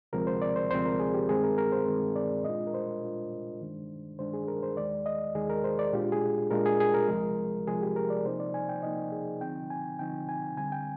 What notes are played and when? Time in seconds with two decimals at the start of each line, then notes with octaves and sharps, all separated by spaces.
0.13 D2 C3 F3 G#3 C4 A#4
0.27 C5
0.42 D5
0.56 C5
0.71 D2 C3 F3 G#3 C4 C5
0.86 A#4
1.00 G#4
1.14 G4
1.28 G2 D#3 G#3 C4 G#4
1.43 A#4
1.58 A#4
1.72 C5
1.87 G2 D#3 G#3 C4
2.16 D5
2.45 A#2 G#3 D4 F4 D#5
2.67 A#4
2.74 C5
3.03 A#2 G#3 D4 F4
3.61 G2 D#3 G#3 D4
4.19 G2 D#3 G#3 D4 C5
4.34 G#4
4.48 A#4
4.63 C5
4.77 D#2 D#3 G#3 D5
5.06 D#5
5.35 D#2 D#3 G#3 G#4
5.49 A#4
5.64 C5
5.79 D5
5.93 A#2 G#3 D4 F4 G4
6.12 G#4
6.51 A#2 G#3 D4 F4 A#4
6.66 G#4
6.80 G#4
6.94 A#4
7.08 C2 C3 F3 G#3
7.67 C2 C3 F3 G#3 G#4
7.82 G4
7.96 A#4
8.10 D5
8.25 C3 F3 A#3 D#4 C5
8.40 D5
8.54 G#5
8.69 G5
8.83 C3 F3 A#3 D#4 D#5
9.12 G#4
9.41 D3 F3 C4 D#4 G5
9.70 G#5
9.99 D3 F3 C4 D#4 G5
10.29 G#5
10.57 D3 G3 C4 G#5
10.72 G5